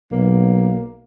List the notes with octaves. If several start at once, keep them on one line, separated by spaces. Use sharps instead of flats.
B1 A#3